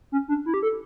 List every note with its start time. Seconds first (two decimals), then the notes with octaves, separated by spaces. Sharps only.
0.12 C#4
0.28 D4
0.46 E4
0.54 G4
0.63 A4